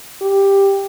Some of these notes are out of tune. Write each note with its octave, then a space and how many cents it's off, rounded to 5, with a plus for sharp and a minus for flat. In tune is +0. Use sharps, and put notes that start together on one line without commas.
G4 +10